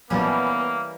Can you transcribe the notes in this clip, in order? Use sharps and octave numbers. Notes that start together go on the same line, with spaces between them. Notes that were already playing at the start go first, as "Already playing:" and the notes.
A#1 E3 F#3 G3 A#3 B3 C#4 A5